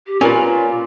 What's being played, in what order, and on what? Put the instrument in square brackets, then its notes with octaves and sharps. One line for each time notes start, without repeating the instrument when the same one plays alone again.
[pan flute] G4
[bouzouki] A#2 [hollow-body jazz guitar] C#4 A#4 B4 [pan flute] F4 [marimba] G#5